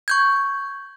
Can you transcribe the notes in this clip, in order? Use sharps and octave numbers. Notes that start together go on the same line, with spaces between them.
C#6 G6 G#6